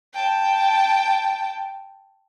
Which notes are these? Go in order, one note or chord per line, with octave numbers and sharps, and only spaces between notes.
G5 A5